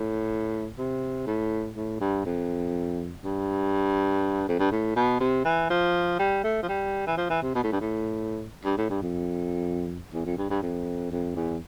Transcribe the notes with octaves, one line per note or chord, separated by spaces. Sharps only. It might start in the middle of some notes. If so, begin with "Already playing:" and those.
Already playing: A2
C3
A2
A2
G2
F2
G2
F2
G2
A2
B2
C3
E3
F3
G3
A3
F3
G3
E3
F3
E3
C3
B2
A2
G2
A2
G2
A2
G2
F2
E2
F2
G2
G2
F2
F2
E2